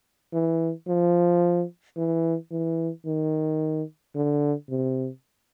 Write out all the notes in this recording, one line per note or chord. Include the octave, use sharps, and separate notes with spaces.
E3
F3
E3
E3
D#3
D3
C3